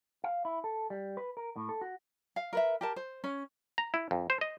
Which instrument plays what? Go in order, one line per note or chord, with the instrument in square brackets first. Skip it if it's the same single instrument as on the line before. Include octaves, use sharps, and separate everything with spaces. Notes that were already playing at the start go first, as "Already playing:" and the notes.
[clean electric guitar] F5
E4
A4
G3
B4
A#4
A2
A4
F#4
[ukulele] F5
A#4 B4 E5
G4 A#4 A5
C5
C#4
[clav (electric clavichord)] A#5
E4
F2
C5
D#5